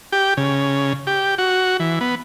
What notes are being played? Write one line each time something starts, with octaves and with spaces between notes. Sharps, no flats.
G4
C#3
G4
F#4
E3
B3